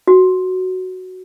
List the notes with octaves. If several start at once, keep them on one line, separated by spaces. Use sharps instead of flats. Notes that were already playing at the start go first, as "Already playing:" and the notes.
F#4